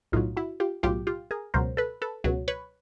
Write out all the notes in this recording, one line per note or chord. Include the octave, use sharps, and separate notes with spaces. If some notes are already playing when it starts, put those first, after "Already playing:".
B1 A2 F#3 D#4 F4
E4 F#4
F4 G4
B1 A2 F#3 F4 G4
F4 G4
G#4 A#4
C#2 B2 F#3 A#4 C5
A4 B4
A4 B4
C#2 B2 F#3
B4 C#5